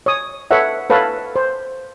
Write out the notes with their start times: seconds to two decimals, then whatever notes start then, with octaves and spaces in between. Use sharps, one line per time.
0.06 C#5 D#6
0.51 A4 B4 C#5 E5 F#5
0.90 A4 B4 C#5 F5 A5
1.36 C5